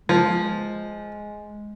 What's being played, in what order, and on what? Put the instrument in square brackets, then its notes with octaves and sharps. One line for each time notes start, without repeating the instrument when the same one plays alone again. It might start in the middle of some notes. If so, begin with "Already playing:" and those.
[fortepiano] F3 [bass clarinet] G#3